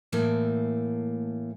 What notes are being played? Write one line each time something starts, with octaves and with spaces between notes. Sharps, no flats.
A2 E3 A3 A#3